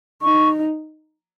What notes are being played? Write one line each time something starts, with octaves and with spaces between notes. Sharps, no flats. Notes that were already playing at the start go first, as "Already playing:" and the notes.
D#4 C#6